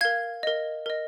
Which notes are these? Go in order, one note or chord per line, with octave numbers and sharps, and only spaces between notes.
A#4 F5 G#6
A#4 D#5
A#4 D#5